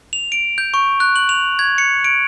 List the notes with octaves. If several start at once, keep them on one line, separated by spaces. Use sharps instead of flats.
F7
D7
G6
C#6
F#6
F#7
F7
G#6
C#7
D7